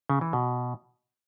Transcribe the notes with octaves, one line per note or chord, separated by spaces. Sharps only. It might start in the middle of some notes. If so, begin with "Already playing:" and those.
C#3
E3
B2